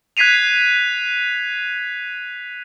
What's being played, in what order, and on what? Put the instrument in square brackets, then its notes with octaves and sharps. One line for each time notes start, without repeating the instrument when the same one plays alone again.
[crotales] F#6 G#6 B6 C7 D#7 F7